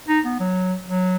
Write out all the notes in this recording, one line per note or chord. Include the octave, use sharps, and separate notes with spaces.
D#4
B3
F#3
F#3